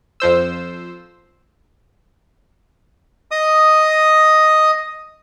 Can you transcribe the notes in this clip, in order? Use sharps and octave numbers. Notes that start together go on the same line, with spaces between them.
F2 F3 C5 E6
D#5 D#6